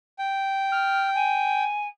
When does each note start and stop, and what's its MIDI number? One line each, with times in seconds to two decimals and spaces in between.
0.19 1.64 79
0.71 1.07 89
1.14 1.87 80